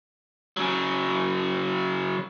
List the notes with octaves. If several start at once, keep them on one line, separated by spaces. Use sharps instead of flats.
C#3 F#3